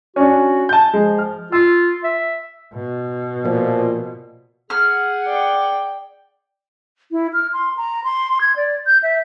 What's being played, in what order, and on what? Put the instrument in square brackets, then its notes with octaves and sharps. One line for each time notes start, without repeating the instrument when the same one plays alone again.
[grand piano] C#4 D4 [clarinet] F#4
[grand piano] A5 G6
[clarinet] F3 [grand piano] G#3
[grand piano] F6
[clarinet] F4 [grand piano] E6
[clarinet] E5
[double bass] B2
[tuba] A#2 [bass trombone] F3
[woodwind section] G#4 F#5 [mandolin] F6
[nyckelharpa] D5 G5
[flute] E4
F6
C6
A#5
C6
G#6
D5
G6
E5